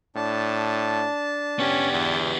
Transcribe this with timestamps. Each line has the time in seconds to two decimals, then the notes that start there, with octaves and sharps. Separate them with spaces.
0.16 A2 D4 A5
1.59 B3 C#4 G4
1.93 E2